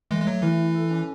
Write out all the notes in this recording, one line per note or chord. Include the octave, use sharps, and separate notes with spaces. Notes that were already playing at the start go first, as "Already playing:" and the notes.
E3 G#3 A3
G#3
F#3 A3
E3 E4
E4
A4
C#4